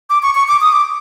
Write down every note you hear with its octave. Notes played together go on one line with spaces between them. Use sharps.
D6
C#6
C#6
D6
D#6
D6